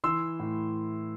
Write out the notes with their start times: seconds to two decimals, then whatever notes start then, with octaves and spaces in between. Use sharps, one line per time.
0.04 E3 C6 E6
0.39 A2